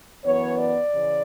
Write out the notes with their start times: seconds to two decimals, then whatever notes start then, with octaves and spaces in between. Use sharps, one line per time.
0.25 F#2 E3 B3 C#5
0.58 D5
0.92 C#3 E3